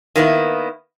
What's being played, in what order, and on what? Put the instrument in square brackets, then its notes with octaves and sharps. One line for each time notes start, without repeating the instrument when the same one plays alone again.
[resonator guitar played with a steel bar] D#3 A#3 B3 E4